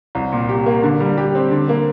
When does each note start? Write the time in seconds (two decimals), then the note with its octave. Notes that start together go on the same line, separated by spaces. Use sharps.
0.15 C2
0.32 A#2
0.49 G4
0.66 A#3
0.84 D3
1.00 G3
1.18 G4
1.35 C4
1.51 D3
1.69 A#3